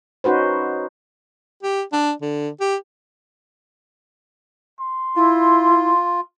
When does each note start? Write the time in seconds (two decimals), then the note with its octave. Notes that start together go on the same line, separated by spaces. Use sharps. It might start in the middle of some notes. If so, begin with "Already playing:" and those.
0.24 C#4 D#4 F#4 B4 C5
1.63 G4
1.93 D4
2.22 D3
2.60 G4
4.80 C6
5.16 E4 F4